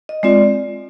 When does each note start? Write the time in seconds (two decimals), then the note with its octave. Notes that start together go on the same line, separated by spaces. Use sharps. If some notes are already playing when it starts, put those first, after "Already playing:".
0.09 D#5
0.23 G#3 C4 F4 D5